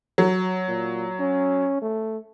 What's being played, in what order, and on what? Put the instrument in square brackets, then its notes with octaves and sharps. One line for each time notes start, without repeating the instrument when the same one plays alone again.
[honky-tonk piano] F#3
[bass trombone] A#2
C#4
A3